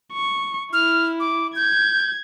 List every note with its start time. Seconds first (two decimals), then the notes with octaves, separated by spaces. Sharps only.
0.13 C#6
0.73 E4 F6
1.20 D6
1.56 G6 G#6